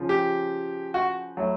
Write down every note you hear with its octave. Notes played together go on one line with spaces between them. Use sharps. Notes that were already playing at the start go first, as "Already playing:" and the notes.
Already playing: C#3 F3
G4
F#4
A2 F#3